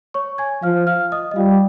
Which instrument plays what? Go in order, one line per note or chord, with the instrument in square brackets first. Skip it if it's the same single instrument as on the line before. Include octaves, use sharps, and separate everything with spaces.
[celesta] C#5 C#6
G#5 G#6
[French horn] F3 [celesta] F5 F6
[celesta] F5 F6
D#5 D#6
D#5
[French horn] G3 [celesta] F4 F5